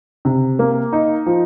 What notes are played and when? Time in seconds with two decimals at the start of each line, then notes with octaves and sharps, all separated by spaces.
0.25 C3
0.59 A#3
0.93 D#4
1.26 F3